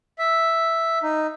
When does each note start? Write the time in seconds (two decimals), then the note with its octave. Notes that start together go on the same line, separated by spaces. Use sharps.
0.18 E5
1.03 D#4